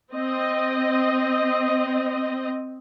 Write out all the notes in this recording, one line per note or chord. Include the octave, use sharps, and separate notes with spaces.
C4 D#5